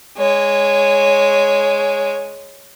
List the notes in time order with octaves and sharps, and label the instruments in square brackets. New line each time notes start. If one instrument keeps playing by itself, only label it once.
[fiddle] G#3 C#5